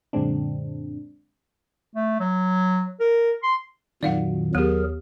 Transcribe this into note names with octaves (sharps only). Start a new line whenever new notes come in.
F#2 A#2 D3 G#3 C4 D4
A3
F#3
A#4
C6
F2 A#2 D#3 F#3 D5 F5 F#5
D#2 F#3 B3 G4 G#4 A#4